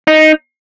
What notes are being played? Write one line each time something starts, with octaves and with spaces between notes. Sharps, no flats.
D#4